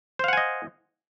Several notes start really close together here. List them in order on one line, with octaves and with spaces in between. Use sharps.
C5 F5 F#5 G#5 D#5